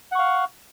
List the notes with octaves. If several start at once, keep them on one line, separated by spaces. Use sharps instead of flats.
F5 F#5 C#6